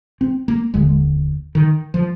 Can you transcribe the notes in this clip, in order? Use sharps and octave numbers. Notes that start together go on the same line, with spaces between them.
C4
A#3
F1 D#2 D3 G#3
D#3
F3